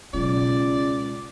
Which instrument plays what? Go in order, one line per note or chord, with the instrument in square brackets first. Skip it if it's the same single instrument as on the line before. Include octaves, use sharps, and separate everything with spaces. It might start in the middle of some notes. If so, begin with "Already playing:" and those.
[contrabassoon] C#2 [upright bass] B2 F#3 [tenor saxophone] D5